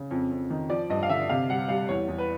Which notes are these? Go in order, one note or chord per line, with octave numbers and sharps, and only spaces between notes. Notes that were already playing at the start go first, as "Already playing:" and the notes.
Already playing: C#3
F2
F2
D#3
F3 D5
G2 D#5
F5
D3 E5
C3 F5
G3 F#5
G3 F5
E2 C#5
E2
B4